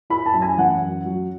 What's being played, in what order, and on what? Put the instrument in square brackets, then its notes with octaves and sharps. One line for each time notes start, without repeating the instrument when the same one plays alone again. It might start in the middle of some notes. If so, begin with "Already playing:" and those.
[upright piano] E4 B5
A5
F#2
G#5
E3 F#5
F#2
F#3